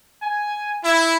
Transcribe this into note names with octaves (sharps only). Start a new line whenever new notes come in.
G#5
E4